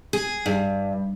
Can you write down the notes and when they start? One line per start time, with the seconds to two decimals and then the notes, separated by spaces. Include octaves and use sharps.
0.13 G#4
0.46 G2